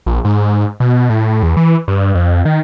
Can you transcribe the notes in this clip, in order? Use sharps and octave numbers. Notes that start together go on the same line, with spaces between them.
A#1
G#2
B2
A2
E2
E3
G2
F2
D#3